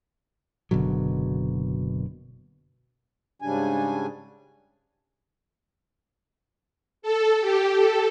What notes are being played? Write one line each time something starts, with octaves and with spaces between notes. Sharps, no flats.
F#1 B2 D3 F#3
G#2 C#3 G3 D4 G#5
A4
G4
A4